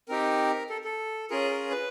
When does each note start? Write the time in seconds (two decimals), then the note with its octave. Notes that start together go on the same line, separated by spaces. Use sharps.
0.09 C4 D#4 G4 A#4
0.70 A4
0.84 A4
1.30 C#4 F4 G#4 A#4
1.51 A#4
1.71 B4